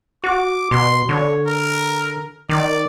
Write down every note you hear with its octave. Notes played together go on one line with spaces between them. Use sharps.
F#4 D6
B2 C6
D3 C#5
A#4
D#3 D5